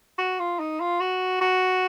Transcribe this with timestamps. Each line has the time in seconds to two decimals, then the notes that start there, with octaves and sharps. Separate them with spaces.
0.18 F#4
0.39 F4
0.60 D#4
0.80 F4
1.00 F#4
1.41 F#4